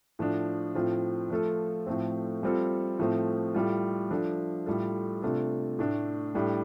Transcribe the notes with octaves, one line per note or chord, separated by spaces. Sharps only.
A2 F3 D4
A2 F3 C4 F4
F3 A3 F4 A4
A2 F3 A3 C4
G3 C4 F4 A4
A2 F3 A3 C4
A2 G3 F4
F3 D4 A4
A2 G3 F4 A4
C3 A3 D4 F4 A4
A2 A3 D4 A4
A2 G3 D4 G4